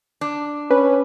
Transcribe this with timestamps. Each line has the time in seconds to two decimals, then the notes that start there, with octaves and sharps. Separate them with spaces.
0.21 D4
0.71 C#4 B4